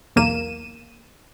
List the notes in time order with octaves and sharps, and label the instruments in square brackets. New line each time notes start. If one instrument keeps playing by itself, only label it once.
[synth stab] B1 E2 A#3 D#7 E7